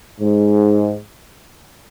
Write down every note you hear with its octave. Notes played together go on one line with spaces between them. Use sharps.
G#2